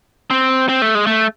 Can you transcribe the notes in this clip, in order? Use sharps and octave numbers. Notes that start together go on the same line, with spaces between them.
C4
C4
A3
G#3
A3